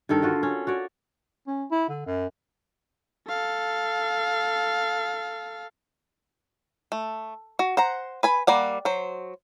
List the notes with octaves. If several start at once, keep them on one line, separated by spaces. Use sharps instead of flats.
G2 D#3 A4 A#4
D3 F4 F#4
C#4
F#4 C#5 D5
C#4
E4
D3
F#2
A4 F5
A3
F#4
C5 F#5 A#5
B4 G#5 B5
G3 A#3 D5 F#5
F#3 C5